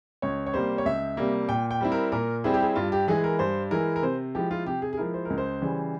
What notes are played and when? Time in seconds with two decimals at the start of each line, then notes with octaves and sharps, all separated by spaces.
0.22 C#2 C#5
0.46 C#5
0.54 C3 G3 A#3 C5
0.78 C#5
0.85 C#2 E5
1.17 C3 G3 A#3
1.48 A#2 G5
1.71 G5
1.81 G3 C4 E4
1.92 A#4
2.12 A#2 A#4
2.44 G3 C4 E4 G#4
2.54 G4
2.62 G#4
2.76 G2 F4
2.92 G4
3.08 E3 G#3 E4 G#4
3.24 A#4
3.39 G2 C5
3.71 E3 G#3 E4 A#4
3.96 A#4
4.03 C3 C5
4.35 F3 G#3 E4 G4
4.51 F4
4.66 C3 G4
4.82 G#4
4.93 G#4
4.97 F3 G#3 E4 A#4
5.14 C5
5.25 C#2 A#4
5.38 C5
5.62 C#3 E3 G3